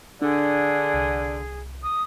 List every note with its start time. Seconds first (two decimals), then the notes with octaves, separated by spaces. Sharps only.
0.22 D3 D4 G#4
0.94 C2
1.83 D#6